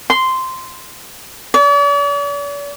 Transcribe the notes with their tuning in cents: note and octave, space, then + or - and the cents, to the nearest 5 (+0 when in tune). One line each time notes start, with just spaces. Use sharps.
C6 -10
D5 -45